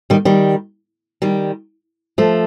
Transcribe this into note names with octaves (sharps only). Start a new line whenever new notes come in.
D#3 G3
D#3 G3
D#3 G3
F3 A3